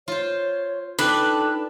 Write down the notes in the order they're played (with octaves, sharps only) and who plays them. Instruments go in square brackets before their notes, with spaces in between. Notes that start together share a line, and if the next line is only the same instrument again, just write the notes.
[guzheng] F4 C5 [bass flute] C#5
[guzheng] D4 [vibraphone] D#4 G5 A5 [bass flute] A4 [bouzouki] B4